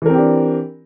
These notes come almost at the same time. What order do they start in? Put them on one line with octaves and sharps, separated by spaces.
E3 A#4 C4 G4 D4